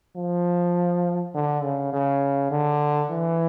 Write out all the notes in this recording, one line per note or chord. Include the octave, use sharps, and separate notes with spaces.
F3
D3
C#3
C#3
D3
E3